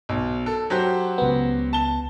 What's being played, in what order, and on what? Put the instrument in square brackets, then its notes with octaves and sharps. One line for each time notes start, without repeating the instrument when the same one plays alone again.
[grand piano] B1
A4
F#3 G4 C5
[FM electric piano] C#2 B3
[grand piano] A5 G7